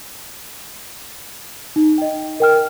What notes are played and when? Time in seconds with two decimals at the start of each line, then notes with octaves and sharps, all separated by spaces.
1.76 D#4
1.98 D#5 G5
2.40 A#4 G5 F6